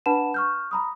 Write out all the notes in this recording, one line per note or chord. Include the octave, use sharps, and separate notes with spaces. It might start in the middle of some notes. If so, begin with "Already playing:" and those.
D4 B4 F#5 A5 B5 E7
C#6 F6 G6
A#5 B5 D#6